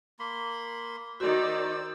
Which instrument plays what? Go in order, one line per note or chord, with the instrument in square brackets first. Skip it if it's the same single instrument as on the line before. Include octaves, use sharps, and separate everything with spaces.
[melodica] A#3 B5 C6
[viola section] D#3 D#4 D5 [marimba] F#4 [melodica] C5 E6